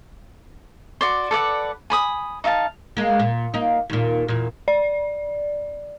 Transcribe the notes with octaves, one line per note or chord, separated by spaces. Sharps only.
F#4 D5 C6
A4 B4 D5 F#5
G#5 B5 D#6
D#4 E5 F5 A5
G#3 A#3
A#2
A#3 D#4
D#2 A#2
E2 A#2
D5